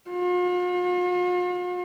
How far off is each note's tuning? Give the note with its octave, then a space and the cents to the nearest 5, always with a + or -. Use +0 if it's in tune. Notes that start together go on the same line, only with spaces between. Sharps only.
F4 +45